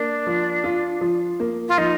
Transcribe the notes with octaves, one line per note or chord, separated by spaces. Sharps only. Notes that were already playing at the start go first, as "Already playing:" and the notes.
Already playing: A#3 D4
F3
F4
F3
A#3
F4
F3 D#4